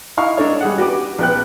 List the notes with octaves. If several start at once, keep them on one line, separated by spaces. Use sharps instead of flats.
D#4 E4 F5 C#6
D4 D#4 A4 C#5
G3 G#4 F#5
F#4 G4 B4 D6
A#1 B3 G5 F#6